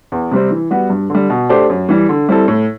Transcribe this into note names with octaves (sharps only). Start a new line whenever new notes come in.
E2
C3 G3 C4
E3
G3 B3 F#4 B4
G2
D3 G3
B2
A3 D4 G4 C5
F#2
E3 G3
D3
G3 C4 E4 A4
A2